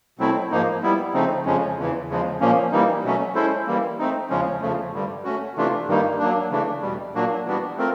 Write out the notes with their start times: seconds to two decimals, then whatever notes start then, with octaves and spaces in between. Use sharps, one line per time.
0.19 B2 F#3 A3 C4 E4
0.51 G#2 F3 A#3 D#4
0.83 G3 B3 E4
1.14 C#3 F3 A3 C4 D#4
1.46 F2 C#3 F3 G#3 C#4
1.77 E2 C#3 E3
2.09 E2 C#3 F3 G#3
2.40 A#2 F3 A#3 C#4
2.72 E3 G3 A#3 D#4
3.04 B2 F#3 A3 C#4
3.35 G#3 C#4 E4 A4 C5
3.67 E3 G3 A#3
3.99 A3 C4 D#4
4.30 E2 C#3 F3 G#3 C#4
4.62 E2 C#3 F3 A3
4.93 G2 D3 G3
5.24 A3 C#4 F#4
5.56 C3 E3 A3 D4 F4
5.87 G2 D#3 G3 A#3 D#4
6.19 F#3 A#3 D4
6.51 C#3 E3 A3 D4
6.82 E2 B2 G3
7.14 A#2 F#3 A#3 D4 F#4
7.45 E3 G3 B3 D4 F#4
7.77 A3 C4 F4 A#4